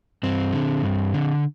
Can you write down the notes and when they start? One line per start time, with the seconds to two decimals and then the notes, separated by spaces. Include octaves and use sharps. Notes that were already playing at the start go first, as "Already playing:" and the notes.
0.23 G2 C4
0.53 D3
0.83 G2
1.13 D3